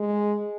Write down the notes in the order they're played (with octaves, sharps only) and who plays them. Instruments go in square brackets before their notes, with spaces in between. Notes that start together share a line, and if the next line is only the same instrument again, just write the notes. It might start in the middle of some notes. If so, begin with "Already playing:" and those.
Already playing: [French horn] G#3